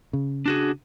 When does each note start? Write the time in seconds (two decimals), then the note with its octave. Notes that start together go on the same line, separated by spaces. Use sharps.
0.13 C#3
0.46 D4 F#4 G#4